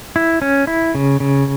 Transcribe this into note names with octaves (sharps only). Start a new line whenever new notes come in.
E4
C#4
E4
C#3
C#3